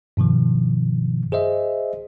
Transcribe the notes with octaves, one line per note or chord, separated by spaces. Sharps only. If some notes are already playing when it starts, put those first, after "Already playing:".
G2 B2 D#3 F3
G#4 C5 D#5 E5